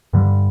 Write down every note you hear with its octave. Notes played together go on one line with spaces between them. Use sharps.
G2 D3 G3